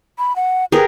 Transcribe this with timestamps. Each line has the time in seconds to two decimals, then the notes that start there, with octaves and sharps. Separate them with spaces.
0.18 B5
0.36 F#5
0.72 G4 G#4 A#4 B4